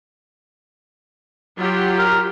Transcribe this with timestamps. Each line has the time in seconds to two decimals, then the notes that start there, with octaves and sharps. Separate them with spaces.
1.57 F#3 F4 G4
1.98 A#4